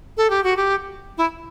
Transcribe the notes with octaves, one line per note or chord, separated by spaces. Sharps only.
A4
G4
F#4
G4
E4